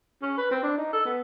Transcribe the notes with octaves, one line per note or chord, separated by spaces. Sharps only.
C#4
B4
C4
D4
D#4
A4
B3